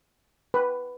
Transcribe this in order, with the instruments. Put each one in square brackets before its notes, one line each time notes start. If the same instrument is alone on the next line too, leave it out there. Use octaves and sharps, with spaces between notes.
[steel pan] B4